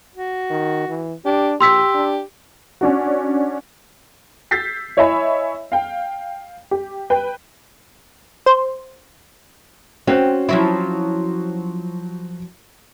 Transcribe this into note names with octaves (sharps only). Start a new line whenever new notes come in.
F#4
D#3
E3
D4 G4
A#1 G4 C6 E6 B6
D4
C#4 D4 F#4
E6 G6 A6 B6 C7
E4 C#5 D#5 E5 G#5 B5
F5 G5
G4
B4 G5
C5
C4 C#4 F#4 C5 F#6
F3 F#3 E4